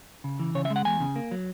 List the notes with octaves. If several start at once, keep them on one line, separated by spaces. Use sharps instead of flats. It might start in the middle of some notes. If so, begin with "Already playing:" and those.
C#3
E3
C#3 C#5
E5
G#3
F#5
E2 G#5
C#3
A#3
F#3